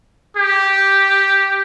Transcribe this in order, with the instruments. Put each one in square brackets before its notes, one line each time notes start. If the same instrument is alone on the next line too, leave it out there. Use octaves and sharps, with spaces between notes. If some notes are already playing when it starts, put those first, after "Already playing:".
[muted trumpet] G4